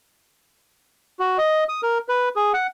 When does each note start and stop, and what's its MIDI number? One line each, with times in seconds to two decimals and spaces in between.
1.19 1.38 66
1.38 1.64 75
1.69 1.81 87
1.83 1.98 70
2.09 2.29 71
2.36 2.53 68
2.54 2.67 78